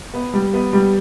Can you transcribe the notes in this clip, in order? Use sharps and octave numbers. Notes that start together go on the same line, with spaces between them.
B3
G3
B3
G3